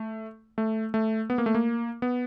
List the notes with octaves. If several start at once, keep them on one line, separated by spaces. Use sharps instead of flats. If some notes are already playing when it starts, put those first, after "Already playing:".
Already playing: A3
A3
A3
B3
A#3
A3
A#3
B3